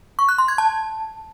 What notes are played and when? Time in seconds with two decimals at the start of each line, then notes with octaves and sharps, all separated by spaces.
0.19 C#6
0.29 F#6
0.38 C6
0.48 G#6
0.58 A5